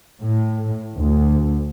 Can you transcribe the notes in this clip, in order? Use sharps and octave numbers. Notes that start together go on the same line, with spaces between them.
A2
D2